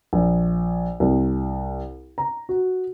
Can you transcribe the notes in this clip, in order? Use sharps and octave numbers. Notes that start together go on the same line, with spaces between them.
A#1
C2
A#5
F#4